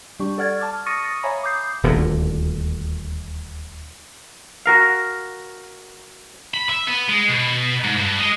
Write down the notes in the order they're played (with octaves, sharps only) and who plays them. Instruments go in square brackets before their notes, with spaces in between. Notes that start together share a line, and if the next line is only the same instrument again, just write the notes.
[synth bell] G3 D4 G4 C#6
A4 D5 F#5 F6 G#6 A6
A5 D6 F6
C#6 D#6 A6 A#6 C#7 D#7
C#5 E5 F5 G#5 A#5 B5
D6 D#6 G6 C7
[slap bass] D#1 D2 A#2
[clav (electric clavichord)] F#4 A#4 F5
[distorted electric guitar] B5
E5
B3
G#3
B2
G#2
G2
G#3